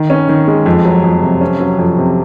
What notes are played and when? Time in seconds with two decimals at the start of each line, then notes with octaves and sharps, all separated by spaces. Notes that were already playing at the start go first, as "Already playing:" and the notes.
Already playing: D#3
0.10 C#4
0.29 D#3
0.47 G#3
0.66 F2
0.85 F#3
1.04 F2
1.22 C3
1.41 C#4
1.60 F#3
1.79 F2
1.98 C3